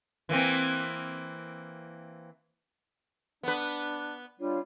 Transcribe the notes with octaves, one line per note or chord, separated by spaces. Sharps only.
E3 A#3 C4
B3 D4 B4
G3 D4 F4 C#5